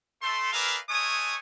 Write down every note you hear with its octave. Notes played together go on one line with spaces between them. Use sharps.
A3 A4 C6
G#4 A#4 B4 D5 E5 F5
G#3 A3 C#5 G#5 C#6 D#6